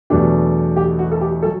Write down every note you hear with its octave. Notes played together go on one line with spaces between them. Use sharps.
E2 B2 F#3 A3 D4 G4
G4
F#4
A4
G4
F#3 A4